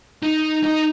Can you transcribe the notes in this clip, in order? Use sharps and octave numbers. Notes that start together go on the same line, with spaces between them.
D#4
D#4